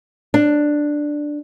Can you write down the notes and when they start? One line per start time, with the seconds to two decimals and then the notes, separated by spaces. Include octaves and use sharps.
0.34 D4